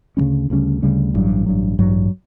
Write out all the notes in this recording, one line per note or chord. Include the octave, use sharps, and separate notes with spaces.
D2 C#3 G3 C#4
D2 C#3 G3 C#4
D2 C#3 G3 C#4
A1 G2 F#3
A1 G2 F#3
A1 G2 F#3